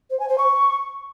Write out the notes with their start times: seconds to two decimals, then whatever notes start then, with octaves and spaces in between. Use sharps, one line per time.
0.10 C5
0.19 G#5
0.28 C5
0.38 C#6